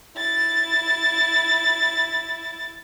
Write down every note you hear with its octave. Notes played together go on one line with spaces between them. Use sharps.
E4 A6